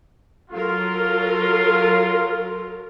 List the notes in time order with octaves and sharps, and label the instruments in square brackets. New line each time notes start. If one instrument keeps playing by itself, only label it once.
[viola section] F#3 A4 A#4 [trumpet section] F4